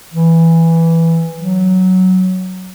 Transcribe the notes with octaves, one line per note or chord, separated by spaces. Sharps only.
E3
F#3